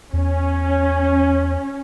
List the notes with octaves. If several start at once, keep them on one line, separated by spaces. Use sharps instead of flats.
E2 C#4